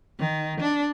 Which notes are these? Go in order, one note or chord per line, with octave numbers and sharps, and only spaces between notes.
D#3
D4